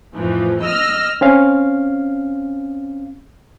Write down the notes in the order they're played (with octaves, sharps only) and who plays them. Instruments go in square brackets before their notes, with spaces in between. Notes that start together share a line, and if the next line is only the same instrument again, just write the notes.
[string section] F2 A2 E3 F3
D#5 E6 F6 A#6
[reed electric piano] C4 C#4 F5